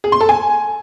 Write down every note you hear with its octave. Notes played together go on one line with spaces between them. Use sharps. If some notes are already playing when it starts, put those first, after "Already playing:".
G#4
C6
A4
G#5